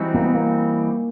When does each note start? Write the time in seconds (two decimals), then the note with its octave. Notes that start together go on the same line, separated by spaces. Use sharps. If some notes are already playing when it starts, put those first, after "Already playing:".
Already playing: E3 G3 C4 D#4 F#4
0.14 A#3
0.24 B3
0.34 A#3